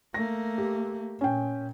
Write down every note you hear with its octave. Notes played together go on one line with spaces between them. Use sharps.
A3 A#3 A#6
G4
A#2 C#4 G5